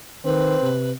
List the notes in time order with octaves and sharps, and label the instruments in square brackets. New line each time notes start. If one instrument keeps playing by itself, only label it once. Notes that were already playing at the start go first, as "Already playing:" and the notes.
[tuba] D#3 [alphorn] C4 [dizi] B4
[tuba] C3